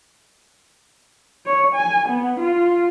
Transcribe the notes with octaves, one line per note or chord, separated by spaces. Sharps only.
C#5
G#5
B3
F4